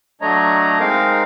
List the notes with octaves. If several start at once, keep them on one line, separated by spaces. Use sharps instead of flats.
F#3 A3 D4 C#5 D#5 A#5
G#3 C4 D#4 A#4 F5